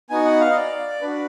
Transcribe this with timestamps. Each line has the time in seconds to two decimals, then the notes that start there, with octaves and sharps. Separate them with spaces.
0.10 B3 D#4 F#4 G#5
0.25 F#5
0.40 F5
0.51 D#5
0.56 D5
1.02 D4 F#4 B4